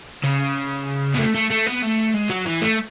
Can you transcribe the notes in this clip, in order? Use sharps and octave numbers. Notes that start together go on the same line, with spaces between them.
C#3
B3
A3
A3
A3
B3
A3
G#3
F#3
E3
A3